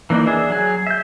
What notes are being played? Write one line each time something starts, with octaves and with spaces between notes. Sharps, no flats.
E3 A#3 D4 D#4
D4 G#4 E5
F#3 G#4
E5 G6